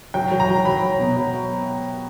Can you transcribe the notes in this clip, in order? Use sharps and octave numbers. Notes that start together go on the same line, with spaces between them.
F#3 G5
F#3
A#5
F#3
F#3 B5
F#3
B2
F#3